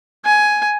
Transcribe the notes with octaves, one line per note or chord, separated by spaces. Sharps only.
G#5